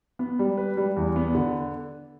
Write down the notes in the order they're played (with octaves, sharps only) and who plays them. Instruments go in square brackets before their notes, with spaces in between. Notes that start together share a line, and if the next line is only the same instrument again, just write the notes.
[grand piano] B3
G3
B4
G3
E2
B3
D3